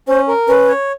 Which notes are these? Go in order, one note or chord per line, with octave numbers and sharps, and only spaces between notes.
C#4 C5
A#4
C#4 B4
C#5